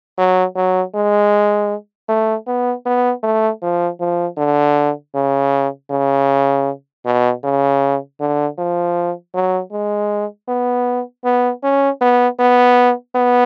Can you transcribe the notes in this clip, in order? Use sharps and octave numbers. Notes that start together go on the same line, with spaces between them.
F#3
F#3
G#3
A3
B3
B3
A3
F3
F3
D3
C#3
C#3
B2
C#3
D3
F3
F#3
G#3
B3
B3
C#4
B3
B3
B3